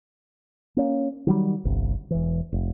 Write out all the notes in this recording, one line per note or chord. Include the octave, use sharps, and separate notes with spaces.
A#3 C#4
D#3 F#3 G3
G1 C2
E1 E3
F1